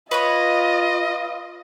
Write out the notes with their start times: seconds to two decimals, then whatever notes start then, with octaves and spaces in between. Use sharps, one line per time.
0.11 F4 B4 C#5 D#5 B5